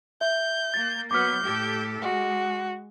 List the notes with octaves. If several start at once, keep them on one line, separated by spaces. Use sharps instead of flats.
E5 G6
A#3 A6
F#3 B3 D6 F6 G6
A2 G4 A4
G#3 F#4